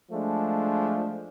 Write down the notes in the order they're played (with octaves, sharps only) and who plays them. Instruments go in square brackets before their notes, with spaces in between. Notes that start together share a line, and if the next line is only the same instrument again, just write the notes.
[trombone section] F3 G#3 A3 D4